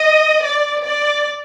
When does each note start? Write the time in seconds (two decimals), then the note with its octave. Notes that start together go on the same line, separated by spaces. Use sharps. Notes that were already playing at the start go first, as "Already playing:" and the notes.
Already playing: D#5
0.41 D5
0.82 D5